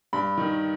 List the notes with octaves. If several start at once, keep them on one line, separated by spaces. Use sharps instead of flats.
G2 B5
D#3